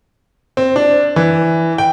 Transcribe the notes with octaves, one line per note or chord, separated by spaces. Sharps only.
C4
D4
E3
G5